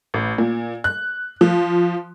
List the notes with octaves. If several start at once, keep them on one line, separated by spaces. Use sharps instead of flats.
A1
A#2
F#6
F3